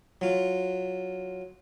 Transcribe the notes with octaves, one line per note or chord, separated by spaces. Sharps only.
F#3 F4